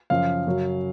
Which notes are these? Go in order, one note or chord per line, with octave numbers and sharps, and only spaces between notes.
F#2 C#3 F3 F5
F#2 C#3 F#3